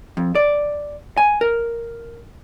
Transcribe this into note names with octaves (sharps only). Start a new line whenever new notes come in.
F2
D5
G#5
A#4